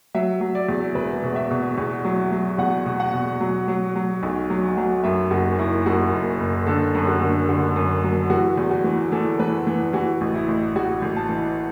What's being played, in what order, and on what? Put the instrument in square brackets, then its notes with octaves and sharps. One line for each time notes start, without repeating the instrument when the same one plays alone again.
[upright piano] F#3 E5
F#3
D5
E2
E1 B4
B2
E5
B2
E2
F#3
F#3
E2 F#5
B2
F#5
B2
F#3
F#3
F#3
B1
F#3
F#3
F#2 E5
F#1 F#4
F#2 E4
F#2 F#4
F#1
F#1
D3 A4
F#2
F#4
D3
D3 F#4
F#2
F#3
E3 F#4
E2
F#4
E3
E3 A4
E3 B4
E3
E3 F#4
A1
E4
A1
A1 F#4
A1
A5
E3